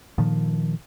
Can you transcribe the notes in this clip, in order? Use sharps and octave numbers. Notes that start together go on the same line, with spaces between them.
A#2 D#3 F3